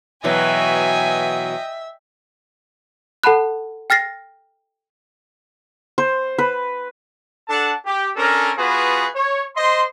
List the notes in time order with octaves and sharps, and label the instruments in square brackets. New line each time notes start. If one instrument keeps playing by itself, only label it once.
[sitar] B2 E3 F#3 [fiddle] D#5 G5 [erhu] E5 [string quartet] G#5
[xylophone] A4 F#5 A5 B5 F#6
G5 F6 A6 A#6 C7
[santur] C5
B4
[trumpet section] D4 A4 F#5 A5
G4
C#4 D4 A4 A#4
B3 F4 F#4 G#4 B4
C#5
C5 D#5 C6